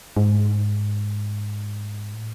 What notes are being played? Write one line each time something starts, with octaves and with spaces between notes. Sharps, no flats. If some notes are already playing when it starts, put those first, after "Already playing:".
G#2
A2